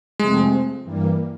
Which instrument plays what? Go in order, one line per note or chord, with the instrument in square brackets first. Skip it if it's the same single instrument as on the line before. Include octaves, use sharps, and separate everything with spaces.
[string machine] F2 C3 F3 A3 C4 [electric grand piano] G#3
[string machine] G2 E3 G3 A#3